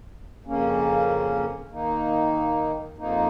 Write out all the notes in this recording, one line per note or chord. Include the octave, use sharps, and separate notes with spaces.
F2 C#3 A#3 C#4
D#3 A#3 D#4
F2 F3 A#3 D#4